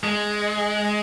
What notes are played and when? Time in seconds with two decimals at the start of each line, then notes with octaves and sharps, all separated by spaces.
0.04 G#3